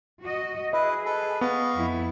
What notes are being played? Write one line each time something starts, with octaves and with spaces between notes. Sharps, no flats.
F#4 D#5
E4 G#4 B4 D#5
A4 B4
B3 D#5 F5 C#6
F2 E4